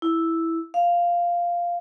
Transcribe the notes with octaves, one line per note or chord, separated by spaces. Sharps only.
E4
F5